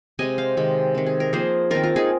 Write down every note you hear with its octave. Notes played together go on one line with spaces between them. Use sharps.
C3 G#3 C4 D#5 G#5
C5 F5
C3 D#3 G#3
D#3 C4
G#4
A#4
F3 A#3 G#4 C5
D#3 C4 F4 A#4
F4
D#4 G#4